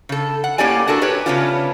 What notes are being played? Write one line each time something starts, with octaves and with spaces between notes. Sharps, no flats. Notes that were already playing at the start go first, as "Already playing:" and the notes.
C#3 A4
F#5
A2 A#3 C#4 G4 D5 G#5
D4 F#4 A4 A#4
G4 B4 C#5
C#3 A3 B3 C#4 D4 F4